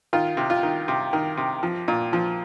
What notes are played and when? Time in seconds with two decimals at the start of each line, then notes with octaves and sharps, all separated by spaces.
0.13 D#3 F4
0.37 C3
0.50 F4
0.63 D#3
0.88 C3
1.13 D#3
1.37 C3
1.63 F3
1.88 A#2
2.13 F3